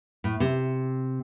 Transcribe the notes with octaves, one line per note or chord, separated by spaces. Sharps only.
A2
C3